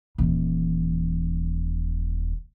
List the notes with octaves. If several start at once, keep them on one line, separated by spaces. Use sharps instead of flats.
D#1 E3